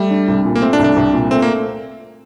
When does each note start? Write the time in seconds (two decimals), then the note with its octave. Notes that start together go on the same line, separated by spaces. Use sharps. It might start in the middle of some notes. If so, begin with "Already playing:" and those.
Already playing: G3 A3
0.11 D4
0.28 C2
0.45 A#2
0.55 A#3
0.62 A3 C4
0.73 D4
0.79 C2
0.84 D4
0.96 C2
1.14 A#2
1.31 A3 C4
1.42 A#3